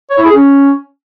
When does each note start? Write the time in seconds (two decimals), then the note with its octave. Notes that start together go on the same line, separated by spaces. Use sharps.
0.10 C#5
0.18 E4
0.25 G#4
0.33 C#4